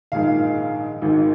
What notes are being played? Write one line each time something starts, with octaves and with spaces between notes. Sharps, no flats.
A#1 G#2 D#3 F5
G#1 G#2 D#3